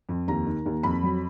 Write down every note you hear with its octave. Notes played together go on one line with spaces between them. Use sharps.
F2
D#2 A#5
D#3
D#2
F2 B5
F#3